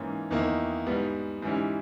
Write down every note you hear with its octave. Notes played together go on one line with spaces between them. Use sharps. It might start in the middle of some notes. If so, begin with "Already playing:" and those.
Already playing: G#2 E3 A#3 C#4
E2 D#3 A#3 E4
G#2 G3 B3
G#2 E3 G3 C#4 E4